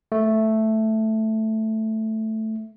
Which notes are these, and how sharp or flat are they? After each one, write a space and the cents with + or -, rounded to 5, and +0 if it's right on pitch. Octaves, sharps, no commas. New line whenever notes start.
A3 +0